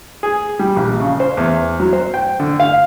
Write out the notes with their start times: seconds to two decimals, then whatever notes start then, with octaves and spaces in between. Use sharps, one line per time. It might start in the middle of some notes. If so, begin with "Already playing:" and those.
0.23 G#4
0.59 G3
0.76 A#1
1.00 C#3
1.20 C5
1.37 E2
1.80 F#3
1.93 C5
2.14 G5
2.40 D3
2.60 F5